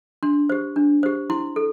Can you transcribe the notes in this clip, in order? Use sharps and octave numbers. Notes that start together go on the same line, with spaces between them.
D4 C6
G4 C5
D4
G4 C5
E4 C6
A4